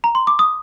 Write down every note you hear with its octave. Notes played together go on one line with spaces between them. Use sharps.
A#5
C6
D6
D#6